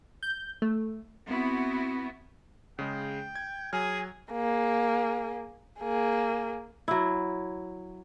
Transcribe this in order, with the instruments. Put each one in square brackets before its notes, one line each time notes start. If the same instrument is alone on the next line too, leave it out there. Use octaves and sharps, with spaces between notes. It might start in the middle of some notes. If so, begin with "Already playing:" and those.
[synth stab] G6
A3
[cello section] B3 E4 F#4 [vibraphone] C4
[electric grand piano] C#3 G#3 [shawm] G5
[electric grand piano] G#6
[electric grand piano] F#3 F6 [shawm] G#4 [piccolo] G#5
[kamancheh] A#3 G#4
A#3 G#4
[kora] F#3 E4